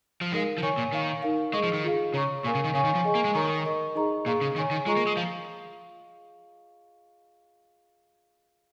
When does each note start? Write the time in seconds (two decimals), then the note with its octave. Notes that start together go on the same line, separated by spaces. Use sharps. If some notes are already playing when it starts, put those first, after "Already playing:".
0.21 F3
0.32 G#3 D#4 A#4 F5
0.58 F3
0.63 D#3 C#5 G#5 C#6
0.77 A#2
0.93 D#3 C#5 F5 C#6
1.22 D#4 A#4 F5
1.53 G#3 G#4 D#5 C#6
1.63 F3
1.73 D#3
1.84 F4 G#4 F5
2.14 C#3 C#5 A#5 C#6
2.44 A#2 A#4 F5 G#5 C#6
2.55 C#3
2.64 D#3
2.74 C#3 C#5 F5 G#5 C#6
2.85 D#3
2.95 F3
3.04 G#4 D#5 G#5 C#6
3.15 A#3
3.25 G#3
3.35 D#3 A#4 C#5 A#5 C#6
3.65 A#4 D#5 C#6
3.95 D#4 G#4 D#5 A#5 C#6
4.26 A#2 G#4 F5 A#5 C#6
4.41 C#3
4.56 D#3 C#5 G#5 C#6
4.71 D#3
4.86 G#3 F4 G#4 D#5 A#5 C#6
4.97 A#3
5.07 G#3
5.16 F3 F5